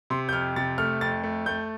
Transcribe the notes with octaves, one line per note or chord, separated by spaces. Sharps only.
C3 C6
G6
F2 F6
C3 A6
A3 F6
F2 A6
A3
A3 G6